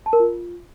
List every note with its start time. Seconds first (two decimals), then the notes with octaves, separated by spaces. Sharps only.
0.06 A5
0.13 A#4
0.20 F4